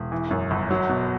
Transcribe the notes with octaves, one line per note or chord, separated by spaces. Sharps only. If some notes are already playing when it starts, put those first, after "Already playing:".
Already playing: E1
E3
F#2
G1
F#3
B2